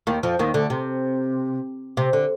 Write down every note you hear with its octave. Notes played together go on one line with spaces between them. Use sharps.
D#2 D#3
F2 F3
D#2 D#3
D2 D3
C3
C3
D3